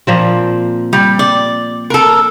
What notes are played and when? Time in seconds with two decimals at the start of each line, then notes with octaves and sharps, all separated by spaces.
0.07 A#2 F3 C4
0.93 G3
1.19 D5
1.90 A4 A#4